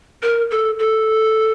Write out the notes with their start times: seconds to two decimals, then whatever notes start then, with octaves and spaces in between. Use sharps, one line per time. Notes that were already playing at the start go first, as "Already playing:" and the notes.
0.22 A#4
0.51 A4
0.79 A4